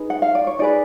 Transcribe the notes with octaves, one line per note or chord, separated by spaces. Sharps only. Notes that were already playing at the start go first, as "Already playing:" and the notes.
Already playing: D#4 G#4 B4
F#5
F5
D5
C#5
D#4 G#4 B4 D5